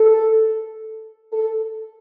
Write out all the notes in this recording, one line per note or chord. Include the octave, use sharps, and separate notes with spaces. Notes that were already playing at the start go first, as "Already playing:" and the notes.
Already playing: A4
A4